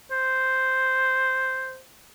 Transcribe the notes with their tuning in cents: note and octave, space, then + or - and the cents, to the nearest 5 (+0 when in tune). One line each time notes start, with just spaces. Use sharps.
C5 -5